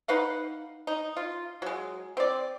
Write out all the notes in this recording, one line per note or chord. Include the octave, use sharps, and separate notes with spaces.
D#4 B4 F5 F#5
D#4
F4
F#3 G#3
C4 D5